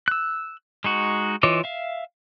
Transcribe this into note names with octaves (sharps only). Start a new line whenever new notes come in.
E6 F#6
G#3 D#4 F#4
E3 F4 C#5 D#5 D6
E5 F5